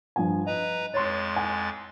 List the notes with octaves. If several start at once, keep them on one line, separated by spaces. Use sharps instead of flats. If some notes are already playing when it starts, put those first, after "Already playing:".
G2 F3 G#5
B4 D#5 A#5
F2 G#3 C#5 C6 A6
G#5